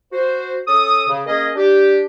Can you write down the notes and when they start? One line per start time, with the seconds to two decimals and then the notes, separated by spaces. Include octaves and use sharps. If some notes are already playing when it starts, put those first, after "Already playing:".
0.13 F#4 C5
0.68 C#4 A4 D#6
1.09 C#3
1.26 A#3 C#4 G#4 D#5
1.56 D4 G4